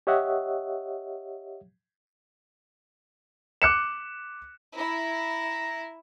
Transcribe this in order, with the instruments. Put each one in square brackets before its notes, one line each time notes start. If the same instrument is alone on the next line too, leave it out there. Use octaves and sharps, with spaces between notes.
[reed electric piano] G4 C#5 D#5 E5 F#5
[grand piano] D6 F#6 C#7 E7
[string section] E4 [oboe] A#5